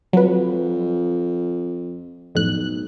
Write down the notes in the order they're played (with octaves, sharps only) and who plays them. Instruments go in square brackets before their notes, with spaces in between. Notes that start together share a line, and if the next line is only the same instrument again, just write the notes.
[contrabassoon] F2 [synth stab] F#3 B4
[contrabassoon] B1 [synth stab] F2 A2 F#6